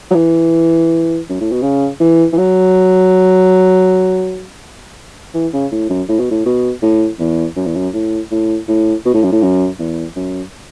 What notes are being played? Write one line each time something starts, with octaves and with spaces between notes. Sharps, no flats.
F#3
E3
F#2
A2
B2
C#3
E3
E3
F#3
E3
C#3
A2
F#2
A2
B2
A2
B2
A2
E2
F#2
E2
F#2
A2
A2
A2
B2
A2
F#2
A2
F#2
E2
F#2